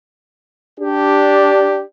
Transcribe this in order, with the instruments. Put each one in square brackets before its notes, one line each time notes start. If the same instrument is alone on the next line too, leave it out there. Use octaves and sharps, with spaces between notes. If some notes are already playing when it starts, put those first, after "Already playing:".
[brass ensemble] D4 G4